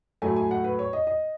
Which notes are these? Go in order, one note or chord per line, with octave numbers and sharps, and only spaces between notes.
A2 F#3 A3 G#5
G#5
F#5
B4
C#5
D#5
D#5